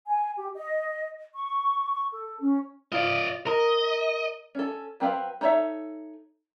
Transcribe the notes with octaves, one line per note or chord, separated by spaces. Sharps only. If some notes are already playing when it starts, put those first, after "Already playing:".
G#5
G4
D#5
C#6
C#6
A4
C#4
F4 D5 D#5
A#4 D#5
C#4 A4
F#3 C4 A#4 B4 F5
D#4 A4 C#5 D5 E5